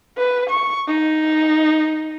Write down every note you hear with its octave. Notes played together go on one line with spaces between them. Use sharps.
B4
C#6
D#4